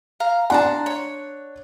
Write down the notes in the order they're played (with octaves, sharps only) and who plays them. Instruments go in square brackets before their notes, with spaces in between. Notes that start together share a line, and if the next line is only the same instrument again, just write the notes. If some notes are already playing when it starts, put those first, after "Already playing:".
[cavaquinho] F5 A#5
[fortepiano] D4 F#5 [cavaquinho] A5 A#5 C6
[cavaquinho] C#5